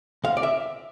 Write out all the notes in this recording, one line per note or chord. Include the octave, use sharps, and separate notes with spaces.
D2 F5
D5
E5